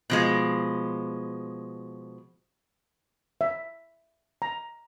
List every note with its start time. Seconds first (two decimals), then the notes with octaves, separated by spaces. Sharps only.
0.10 B2 F3 G#3
3.41 E5
4.42 A#5